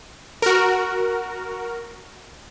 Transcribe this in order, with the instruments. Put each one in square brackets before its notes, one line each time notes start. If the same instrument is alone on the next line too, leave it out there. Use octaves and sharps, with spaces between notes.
[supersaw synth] F#4 A#4